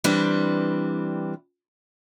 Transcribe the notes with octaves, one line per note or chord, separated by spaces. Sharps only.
E3 G3 C4 D4 B4